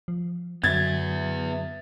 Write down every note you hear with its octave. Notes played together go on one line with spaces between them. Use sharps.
F3
F#2 D3 F#3 B3 E5 G#6 A6